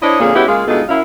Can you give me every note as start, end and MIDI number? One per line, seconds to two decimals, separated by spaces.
0.01 0.19 62
0.01 0.19 64
0.01 0.19 72
0.01 0.19 73
0.01 0.19 75
0.19 0.32 41
0.19 0.32 46
0.19 0.32 50
0.19 0.32 58
0.19 0.32 61
0.19 0.32 68
0.35 0.46 56
0.35 0.46 59
0.35 0.46 61
0.35 0.46 64
0.35 0.46 66
0.35 0.46 67
0.48 0.63 49
0.48 0.63 56
0.48 0.63 58
0.48 0.63 65
0.48 0.63 68
0.67 0.81 38
0.67 0.81 47
0.67 0.81 56
0.67 0.81 63
0.67 0.81 65
0.67 0.81 69
0.88 1.01 42
0.88 1.01 64
0.88 1.01 77